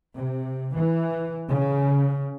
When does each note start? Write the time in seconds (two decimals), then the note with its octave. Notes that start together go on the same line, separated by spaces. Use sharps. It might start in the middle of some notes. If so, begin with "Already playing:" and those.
0.14 C3
0.75 E3
1.49 C#3